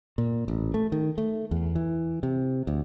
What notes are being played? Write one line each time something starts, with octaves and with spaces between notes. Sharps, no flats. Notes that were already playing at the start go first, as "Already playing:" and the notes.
A#2
A1
A3
D#3
A3
E2
E3
C3
D2